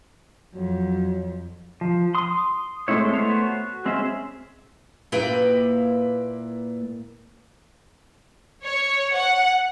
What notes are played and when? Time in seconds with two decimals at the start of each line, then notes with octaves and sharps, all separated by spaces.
0.55 F2 F#3
1.81 F3
2.15 C6 D#6
2.88 G#3 A3 C4 E4 C#5
3.14 A3 B3 C5 C#5
3.47 F#4
3.86 G#3 C4 C#4 G#4 E5
5.12 A#2 A#3 E4 B4 G5
8.64 C#5
9.16 F#5